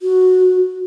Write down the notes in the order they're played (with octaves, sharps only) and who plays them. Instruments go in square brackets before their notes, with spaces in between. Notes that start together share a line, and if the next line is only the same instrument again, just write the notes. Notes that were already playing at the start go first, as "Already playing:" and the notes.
[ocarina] F#4